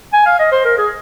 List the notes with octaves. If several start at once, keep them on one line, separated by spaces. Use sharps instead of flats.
G#5
F5
D#5
C5
A#4
G#4